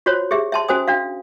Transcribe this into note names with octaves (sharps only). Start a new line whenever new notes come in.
F4 F#4 C5 C#5
G4 G#4 E5
E5 A5 C6
C#4 F#4 C5 G#5 D#6
D4 F#4 F5